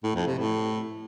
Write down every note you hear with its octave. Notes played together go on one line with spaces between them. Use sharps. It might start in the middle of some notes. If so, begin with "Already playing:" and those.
A2
F2
C3
A2